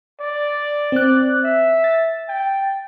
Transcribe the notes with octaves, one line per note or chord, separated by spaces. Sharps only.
D5
C4 F#6
E5
A6
G5